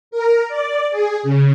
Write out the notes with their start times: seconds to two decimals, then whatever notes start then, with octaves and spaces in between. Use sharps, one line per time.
0.11 A#4
0.48 D5
0.91 G#4
1.23 C#3